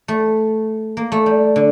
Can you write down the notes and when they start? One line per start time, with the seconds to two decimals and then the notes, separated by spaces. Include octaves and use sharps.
0.08 A3
0.97 A#3
1.12 A3
1.26 G3
1.56 D3